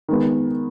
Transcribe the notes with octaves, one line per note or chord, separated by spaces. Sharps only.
D#3 G#3 B3